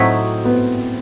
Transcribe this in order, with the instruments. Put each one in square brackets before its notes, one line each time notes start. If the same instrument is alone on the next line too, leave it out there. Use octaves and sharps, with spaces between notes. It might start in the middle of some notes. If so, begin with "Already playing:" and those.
Already playing: [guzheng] A2 F#3 A3 D#4 F#4 [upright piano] C4
[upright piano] B3